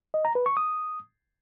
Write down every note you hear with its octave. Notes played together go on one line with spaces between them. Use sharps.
D#5
A#5
B4
C#6
D#6